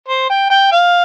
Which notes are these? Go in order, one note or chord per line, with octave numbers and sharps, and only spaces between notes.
C5
G5
G5
F5